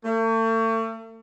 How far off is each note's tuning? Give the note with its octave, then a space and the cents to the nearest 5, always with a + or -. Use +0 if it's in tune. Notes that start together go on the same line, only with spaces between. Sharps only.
A3 +40